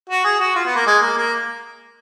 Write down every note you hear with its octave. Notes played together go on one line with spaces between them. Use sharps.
F#4
G#4
F#4
F4
B3
A#3
G#3
A#3
A#3